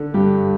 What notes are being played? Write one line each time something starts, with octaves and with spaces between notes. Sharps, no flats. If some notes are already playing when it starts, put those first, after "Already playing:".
Already playing: D3
G2 G4